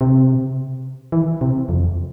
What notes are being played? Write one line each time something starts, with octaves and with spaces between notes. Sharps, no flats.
C3
E3
C3
F2